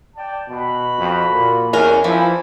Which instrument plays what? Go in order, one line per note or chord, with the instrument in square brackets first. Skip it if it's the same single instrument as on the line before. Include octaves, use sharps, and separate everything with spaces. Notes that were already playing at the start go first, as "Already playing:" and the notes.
[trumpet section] D5 G5 A5
[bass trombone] B2 [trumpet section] F#4 B5
[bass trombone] F2
A#2
[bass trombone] E2 [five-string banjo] C#4 A#4
[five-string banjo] E3 [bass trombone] F3 [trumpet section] E4